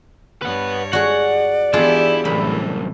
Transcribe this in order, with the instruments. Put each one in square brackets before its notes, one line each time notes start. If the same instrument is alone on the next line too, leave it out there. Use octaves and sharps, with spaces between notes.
[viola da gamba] G2 C#5 [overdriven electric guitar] B4 F#5
[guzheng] F#4 G#4 [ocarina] D5 [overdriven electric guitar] F#5
[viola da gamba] E3 B3 G4 [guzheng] D4 F4 G#4 [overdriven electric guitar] E4
[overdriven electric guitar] C2 F#2 [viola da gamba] A2 E3 [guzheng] B5